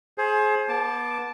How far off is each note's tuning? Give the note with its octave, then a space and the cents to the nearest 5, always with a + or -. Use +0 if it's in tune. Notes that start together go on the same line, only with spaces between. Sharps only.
G#4 +30 C5 +25
B3 -35 A5 -10 D6 +0